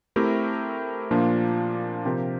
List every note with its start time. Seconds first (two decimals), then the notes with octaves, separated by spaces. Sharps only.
0.16 A3 C4 E4 G4 A#4
1.11 A#2 F3 A#3 D4 F4
2.05 C3 F3 C4 G4 A#4